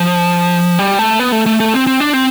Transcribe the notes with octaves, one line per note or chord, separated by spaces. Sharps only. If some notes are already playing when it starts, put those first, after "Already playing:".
Already playing: F3
G3
A3
B3
A3
A3
A3
C4
C4
D4
C4